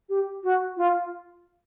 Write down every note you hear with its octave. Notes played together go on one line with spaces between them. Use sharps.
G4
F#4
F4